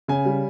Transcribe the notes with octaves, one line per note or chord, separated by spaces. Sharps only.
C#3 G#5
G3